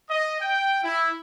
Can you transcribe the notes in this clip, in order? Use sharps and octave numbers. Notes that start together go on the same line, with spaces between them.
D#5
G5
E4